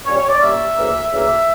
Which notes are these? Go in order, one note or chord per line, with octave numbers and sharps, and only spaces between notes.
A#2 G3 A#3 C#4 C#5
C#5
D5
A#2 G3 A#3 C#4 E5
D2 C#3 E3 A#3
D2 C#3 E3 A#3 E5